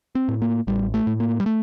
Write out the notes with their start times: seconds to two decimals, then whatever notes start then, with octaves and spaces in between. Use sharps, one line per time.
0.15 C4
0.28 A2
0.42 A#3
0.67 A1 G3
0.94 A3
1.07 A2
1.20 A#3
1.40 G3
1.46 A3